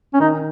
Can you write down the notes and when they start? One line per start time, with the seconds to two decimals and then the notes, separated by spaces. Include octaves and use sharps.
0.14 C#4
0.20 D#3 D#4